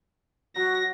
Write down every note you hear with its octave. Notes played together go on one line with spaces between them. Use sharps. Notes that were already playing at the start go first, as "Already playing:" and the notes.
F#3 F#4 A#6